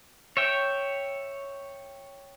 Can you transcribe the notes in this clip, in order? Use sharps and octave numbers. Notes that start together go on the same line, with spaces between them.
C#5 E5 G5